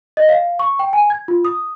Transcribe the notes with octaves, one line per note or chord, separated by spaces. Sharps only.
D#5
F5
C#6
G5
G#5
G#6
F4
D#6